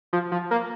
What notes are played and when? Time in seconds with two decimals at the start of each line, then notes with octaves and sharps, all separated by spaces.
0.13 F3
0.32 F3
0.51 A#3